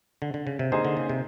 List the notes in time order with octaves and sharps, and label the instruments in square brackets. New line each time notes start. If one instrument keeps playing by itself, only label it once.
[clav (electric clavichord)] D3
D3
C#3
C3
[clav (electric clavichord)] D3 [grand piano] A#3 D#4 G#4 C5
[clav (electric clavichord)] D3
C#3
C3